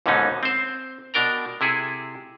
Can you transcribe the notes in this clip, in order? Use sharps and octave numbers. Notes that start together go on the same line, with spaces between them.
D#2 G#2 B2 D3 C#4 D#4
C4 C5
B2 D4 A#4 G5 A#5
C3 E4 G#4 A4